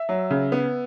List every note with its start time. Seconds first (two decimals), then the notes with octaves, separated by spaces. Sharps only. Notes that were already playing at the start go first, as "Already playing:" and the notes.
Already playing: E5
0.09 F#3
0.31 C#3
0.52 B3